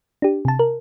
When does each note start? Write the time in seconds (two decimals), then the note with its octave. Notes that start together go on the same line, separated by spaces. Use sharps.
0.22 D4 G4
0.45 C3 A5
0.59 A#4